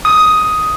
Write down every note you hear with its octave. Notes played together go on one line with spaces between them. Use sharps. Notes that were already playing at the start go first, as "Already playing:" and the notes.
D#6